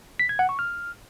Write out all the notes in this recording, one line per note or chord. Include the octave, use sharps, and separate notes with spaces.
B6
G#6
F#5
C#6
F6